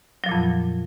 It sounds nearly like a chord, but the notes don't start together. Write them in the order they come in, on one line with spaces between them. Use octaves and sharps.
F#3 F3 A#2 F2